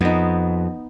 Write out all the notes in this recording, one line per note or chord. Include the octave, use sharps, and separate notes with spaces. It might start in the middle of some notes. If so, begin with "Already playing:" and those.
F2 B3 D#4